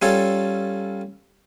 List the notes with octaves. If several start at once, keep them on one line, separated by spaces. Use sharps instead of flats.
G3 C#4 F4 A4 C#5 F5